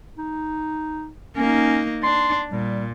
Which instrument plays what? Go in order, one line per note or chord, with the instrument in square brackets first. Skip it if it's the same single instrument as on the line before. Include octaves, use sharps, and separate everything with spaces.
[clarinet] D#4
[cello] A#3 D#4 [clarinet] C#4
[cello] D4 [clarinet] C6
[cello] A#2 [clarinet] G3